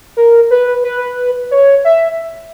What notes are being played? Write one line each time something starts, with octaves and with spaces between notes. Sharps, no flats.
A#4
B4
B4
C#5
E5